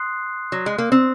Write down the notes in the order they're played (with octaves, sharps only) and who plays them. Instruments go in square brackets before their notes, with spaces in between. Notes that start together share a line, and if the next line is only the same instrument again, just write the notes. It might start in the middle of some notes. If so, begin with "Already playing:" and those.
Already playing: [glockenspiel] C6 D#6 F#6 C7
[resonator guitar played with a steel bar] F#3
G#3
A#3
C4